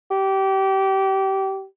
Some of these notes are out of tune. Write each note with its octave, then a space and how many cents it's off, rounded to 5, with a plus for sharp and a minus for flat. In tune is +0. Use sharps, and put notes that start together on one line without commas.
G4 -25